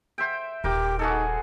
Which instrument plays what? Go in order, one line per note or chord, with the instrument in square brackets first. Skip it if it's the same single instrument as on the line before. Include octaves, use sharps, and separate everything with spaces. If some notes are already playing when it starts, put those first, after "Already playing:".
[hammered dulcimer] C5 E5 G5
[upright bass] D#1 [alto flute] G4 [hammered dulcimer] A#4 G5 D6
[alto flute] D#4 [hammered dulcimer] F#4 G#4 A4